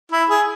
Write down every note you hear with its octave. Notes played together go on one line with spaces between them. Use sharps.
E4
G#4